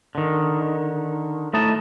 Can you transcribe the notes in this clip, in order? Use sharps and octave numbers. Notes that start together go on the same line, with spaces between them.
D3 D#3
A3 D#4 E4 D#5 A5